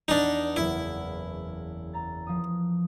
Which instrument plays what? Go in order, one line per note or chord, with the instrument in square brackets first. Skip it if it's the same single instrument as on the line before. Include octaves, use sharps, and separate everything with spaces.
[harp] E2 [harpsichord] D4 D#4
[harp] F#1 E2 [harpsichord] E4
[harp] A#5 A6
F3 D#6